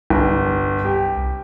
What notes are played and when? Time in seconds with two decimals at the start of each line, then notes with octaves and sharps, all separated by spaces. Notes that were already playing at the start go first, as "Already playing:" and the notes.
0.10 G1 C2
0.85 G4